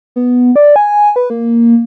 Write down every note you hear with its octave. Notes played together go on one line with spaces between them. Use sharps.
B3
D5
G#5
B4
A#3